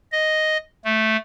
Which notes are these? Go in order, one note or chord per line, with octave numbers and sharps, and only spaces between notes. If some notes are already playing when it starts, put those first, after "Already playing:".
D#5
A3